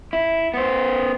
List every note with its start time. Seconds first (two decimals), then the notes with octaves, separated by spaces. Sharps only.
0.13 E4
0.54 B3 C5